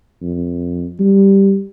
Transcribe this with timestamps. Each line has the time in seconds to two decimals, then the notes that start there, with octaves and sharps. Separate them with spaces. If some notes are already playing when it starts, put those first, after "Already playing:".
0.22 F2
0.99 G3